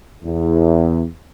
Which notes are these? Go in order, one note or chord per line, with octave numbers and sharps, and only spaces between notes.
E2